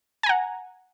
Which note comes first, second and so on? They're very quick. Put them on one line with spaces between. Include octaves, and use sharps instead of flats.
G#5 A#5 F#5